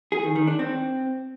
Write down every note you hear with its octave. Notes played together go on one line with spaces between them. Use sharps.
G#4
D#3
D#3
D4
C4